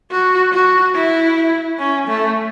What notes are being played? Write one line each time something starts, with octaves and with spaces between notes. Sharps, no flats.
F#4
F#4
E4
C#4
A3